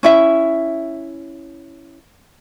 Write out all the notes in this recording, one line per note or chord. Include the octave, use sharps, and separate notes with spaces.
C#4 E4 E5